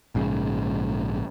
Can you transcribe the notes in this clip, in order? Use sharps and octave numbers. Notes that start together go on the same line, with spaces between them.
A#1 G#2 C#3